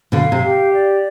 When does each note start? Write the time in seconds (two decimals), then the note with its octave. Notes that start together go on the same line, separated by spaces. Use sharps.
0.12 B2 D3 F5
0.32 C3
0.42 G4
0.73 D5